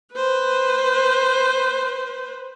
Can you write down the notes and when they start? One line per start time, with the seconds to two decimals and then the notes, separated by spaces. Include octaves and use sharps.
0.15 B4 C5